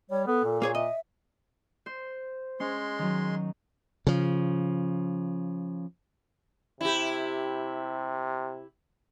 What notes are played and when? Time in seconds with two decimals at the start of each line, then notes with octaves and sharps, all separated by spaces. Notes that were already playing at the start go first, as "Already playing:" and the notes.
0.10 G3 C#5
0.27 B3 A4
0.44 A#2
0.62 A#3 G#4 C#5
0.75 D#5 E5
1.86 C5
2.60 G#3 C#4 C6
2.99 D#3 F#3
4.07 C#3 F3
6.81 C3 E4 G4